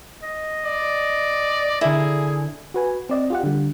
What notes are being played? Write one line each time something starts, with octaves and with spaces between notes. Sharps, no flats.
D#5
D5
D3 E4 G#4 A#4
F#4 B4 G#5
C4 D5 D#5
F4 G4 F#5
D3 G3